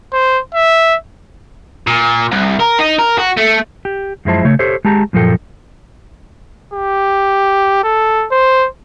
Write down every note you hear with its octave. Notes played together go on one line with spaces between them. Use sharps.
C5
E5
A#2
C2
A#4
D#4
A#4
F#4
A3
G4
F#2 F3 G#3 E4 C5 A5
C#3 A3 C#5
G4 A4 C5 C#5
G#3 G4 A5 A#5
F#2 A#2 F3 A#3 A4 G5
G4
A4
C5